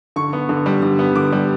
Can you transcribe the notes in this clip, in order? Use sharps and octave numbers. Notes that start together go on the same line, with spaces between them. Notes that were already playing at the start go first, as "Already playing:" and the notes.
D3 C#6
B3
D3
G3
D3
B3
D3 D6
G3